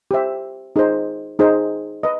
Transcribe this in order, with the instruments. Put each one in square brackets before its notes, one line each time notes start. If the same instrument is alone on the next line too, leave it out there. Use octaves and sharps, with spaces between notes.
[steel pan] G4 C5 E5
D#4 G#4 C5
D#4 G#4 C5
B4 D#5